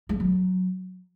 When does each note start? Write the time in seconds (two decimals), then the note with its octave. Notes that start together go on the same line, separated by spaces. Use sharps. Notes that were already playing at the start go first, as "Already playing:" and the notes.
0.09 G#3
0.20 F#3